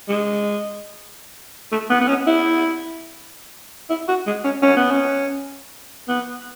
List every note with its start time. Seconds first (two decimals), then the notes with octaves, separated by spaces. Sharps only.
0.08 G#3
1.72 A3
1.90 B3
2.00 B3
2.08 C#4
2.27 E4
3.89 E4
4.08 F#4
4.26 G#3
4.44 C#4
4.62 C#4
4.76 B3
4.91 C#4
6.08 B3